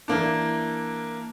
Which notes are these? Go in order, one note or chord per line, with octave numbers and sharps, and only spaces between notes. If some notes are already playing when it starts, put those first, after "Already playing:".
E3 A#3 D4